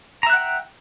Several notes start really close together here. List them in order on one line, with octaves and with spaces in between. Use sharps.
A#5 E5 F#6 F#5 G5